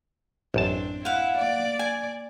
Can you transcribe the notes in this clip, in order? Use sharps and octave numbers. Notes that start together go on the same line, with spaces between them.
A1 F#2 C4 D4 A5
E4 F5 F#5
A#3 D5
G#5